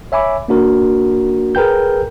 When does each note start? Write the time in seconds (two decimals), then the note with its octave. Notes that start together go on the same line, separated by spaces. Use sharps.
0.12 C#5 E5 G#5 B5 D6
0.48 A#3 D4 F#4 A#4
1.55 G#4 A#4 B4 G5 G6